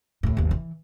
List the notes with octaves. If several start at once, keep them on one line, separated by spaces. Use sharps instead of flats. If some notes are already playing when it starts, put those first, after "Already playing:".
D#2 A2
G1 D#2
E3